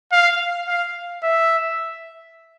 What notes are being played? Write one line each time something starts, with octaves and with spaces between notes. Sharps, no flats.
F5
F5
E5